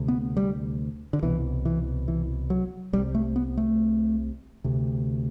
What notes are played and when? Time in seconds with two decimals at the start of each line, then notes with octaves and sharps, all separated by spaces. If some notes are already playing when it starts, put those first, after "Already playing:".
Already playing: D2 C3
0.08 B3
0.37 G3
1.13 D3
1.23 C2 B2 E3
1.65 E3
2.08 E3
2.50 F#3
2.93 C2 G3
2.97 C3
3.15 A3
3.36 B3
3.57 A3
4.64 D2 C3